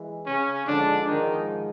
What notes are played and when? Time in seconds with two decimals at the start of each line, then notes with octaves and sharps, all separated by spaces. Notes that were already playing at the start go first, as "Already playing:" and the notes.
Already playing: E3 G#3
0.26 C#3 C#4
0.66 G#2 D3 F3 G#3 D4
1.07 D#3 D#4